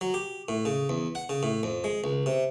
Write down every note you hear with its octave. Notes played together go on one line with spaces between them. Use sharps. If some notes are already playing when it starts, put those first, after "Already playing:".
F#3
G4
A2
C#3
E2
F#5
C#3
A2
F2
G#3
C#2
C3